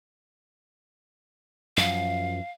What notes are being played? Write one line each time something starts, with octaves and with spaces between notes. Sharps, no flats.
F#2 F3 F5